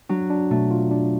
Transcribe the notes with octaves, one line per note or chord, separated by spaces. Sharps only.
F#3 D4
D4
B2 A3
F4
D4